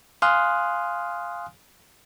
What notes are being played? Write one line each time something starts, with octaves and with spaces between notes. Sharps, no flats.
F5 G#5 C6 D#6 F6 F#6